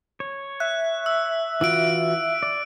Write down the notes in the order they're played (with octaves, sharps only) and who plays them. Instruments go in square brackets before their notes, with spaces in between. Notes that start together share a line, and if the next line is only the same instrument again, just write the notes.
[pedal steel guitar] C#5
[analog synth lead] E5 [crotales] F#6
[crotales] E6
[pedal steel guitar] E3 F4 F#4 [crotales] E6 D7
[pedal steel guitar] D5